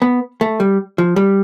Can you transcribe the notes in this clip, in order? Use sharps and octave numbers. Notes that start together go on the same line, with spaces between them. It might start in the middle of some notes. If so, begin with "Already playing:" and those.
B3
A3
G3
F3
G3